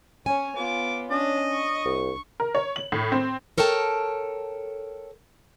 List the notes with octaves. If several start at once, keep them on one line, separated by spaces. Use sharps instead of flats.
C#4 C#5 G#5
B3 F4 D6
C#4 D4 D#5
C#6
C2
A#4
C#5
F#7
A2
C4
A4 A#4 C#5 G5 A5